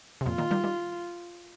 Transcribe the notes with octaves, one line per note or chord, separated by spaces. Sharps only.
C3
F2 A#2 F4
A#2 D#3
D#3 G3
D#3 G3